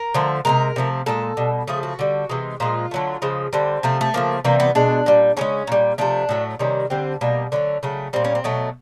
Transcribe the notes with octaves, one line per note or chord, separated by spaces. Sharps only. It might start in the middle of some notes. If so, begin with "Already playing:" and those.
Already playing: A#4
D3 F3 A3
C3 D#3 G#3 A#4
C3 F3 A3
A#2 F3 G#3 A4
B2 G3
C#3 F3 A3 G#4
F#4
D3 G3
C3 E3 G#3
A#2 F3 G#3 F4
D3 F#3 A3
C#3 F3 G#3
D3 G3 C4
C3 F3 A3
A3
C#3 F3 A3 A#3
C3 E3 G3 A#3
B3
B2 G#3 D4
A#2 G3
C#3 F3 G#3 C#4
A#2 G3
C3 F3 A3 D4
A2 F#3 A3
C3 D#3 G3 C#4
D3 G3 C4
B2 G3 A#3
D3 F#3 A3 B3
C#3 F#3 A3
A#2 G3 C4
C#4
C4
B2 F#3 A3